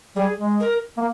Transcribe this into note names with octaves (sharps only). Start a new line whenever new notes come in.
G3 G#4
G#3
A#4
A#3